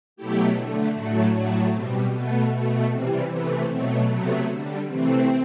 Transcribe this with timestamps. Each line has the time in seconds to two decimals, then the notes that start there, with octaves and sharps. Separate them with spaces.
0.16 B2 F#3 A3 E4 G4
0.56 D3 A3
0.94 A2 F#3 A3 D4 F#4
1.34 A2 F#3 A3 D4 F#4
1.74 B2 G3 C4
2.12 B2 A3 B3
2.52 B2 A3
2.90 C3 E3 G3 C4
3.30 C3 E3 A3 B3
3.69 B2 F#3 A3 C4
4.09 C3 F#3 A3 B3
4.47 D3 G3
4.86 C3 E3 A3 C4